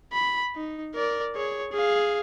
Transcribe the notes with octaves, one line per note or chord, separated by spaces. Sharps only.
B5
D#4
A#4 D5
G#4 C#5
G#4 F5